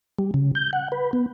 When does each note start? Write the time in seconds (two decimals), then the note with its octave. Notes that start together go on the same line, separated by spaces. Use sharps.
0.19 G3
0.34 C#3
0.55 G6
0.73 F#5
0.92 B4
1.13 B3